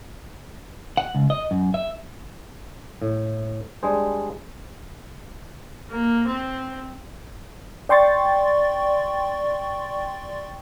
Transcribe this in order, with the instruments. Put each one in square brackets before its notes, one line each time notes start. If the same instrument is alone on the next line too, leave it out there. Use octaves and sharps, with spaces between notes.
[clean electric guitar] F#5
C#2
D#5
F#2
E5
[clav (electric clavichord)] A2
G3 G#3 D4 G#4 C5
[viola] A#3
C4
[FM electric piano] D5 G5 C6 C#6 A6